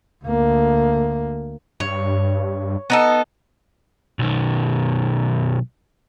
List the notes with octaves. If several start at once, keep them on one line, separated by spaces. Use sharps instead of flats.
D2 A#3
G2 C#5
B3 D#4 A4
B1 D#3